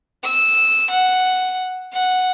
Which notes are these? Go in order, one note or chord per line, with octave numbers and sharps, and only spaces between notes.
E6
F#5
F#5